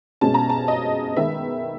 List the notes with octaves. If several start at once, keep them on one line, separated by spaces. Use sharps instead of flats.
B2 G#3 C#4 A5
A#5
A5
D#5
D#3 G#3 B3 E5